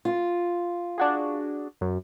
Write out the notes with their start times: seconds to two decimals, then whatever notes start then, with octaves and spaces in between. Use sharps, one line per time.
0.05 F4
0.98 D4 F#4 G#4
1.81 F#2